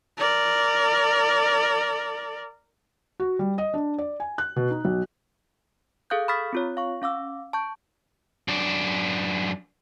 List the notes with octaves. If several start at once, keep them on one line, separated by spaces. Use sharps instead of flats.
A#4 D5
F#4
G3
D#5
D4
D5
G#5
F#6
B2
D#4
B1
G#4 A4 F5 D#6 F#6 G6
B5 C#6 D#6 F6 A6 B6
C4 F4 C#5
F5 C#6
C#4 F5 D6 E6
A5 C#6 G6
F#2 D4